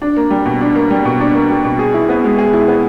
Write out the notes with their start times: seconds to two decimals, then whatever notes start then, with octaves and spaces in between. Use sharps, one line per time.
0.02 D4
0.16 A#3
0.30 G3
0.46 B2
0.61 D4
0.76 A#3
0.90 G3
1.05 B2
1.20 D4
1.35 A#3
1.50 G3
1.64 B2
1.79 G#4
1.94 E4
2.09 B3
2.24 G#3
2.38 G#4
2.53 E4
2.68 B3